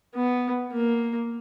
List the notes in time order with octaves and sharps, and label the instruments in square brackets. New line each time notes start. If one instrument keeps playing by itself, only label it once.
[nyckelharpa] B3
A#3